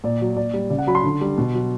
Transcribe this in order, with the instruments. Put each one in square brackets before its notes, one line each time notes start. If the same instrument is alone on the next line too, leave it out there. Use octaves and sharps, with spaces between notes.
[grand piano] A#2 D5
F#3
A#2 D5
G3
C#3 D5
F#5
F#3 B5
C6
D3
G3
B2
F#3